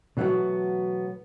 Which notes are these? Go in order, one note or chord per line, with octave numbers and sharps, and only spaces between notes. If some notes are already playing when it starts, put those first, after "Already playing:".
B2 E3 F#3 A3 B3 F#4